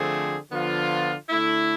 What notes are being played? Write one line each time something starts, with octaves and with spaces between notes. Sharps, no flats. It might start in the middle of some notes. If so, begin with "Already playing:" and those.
Already playing: D3 F3 A3 C4 G#4
D3 F3 B3 F4
D3 A3 E4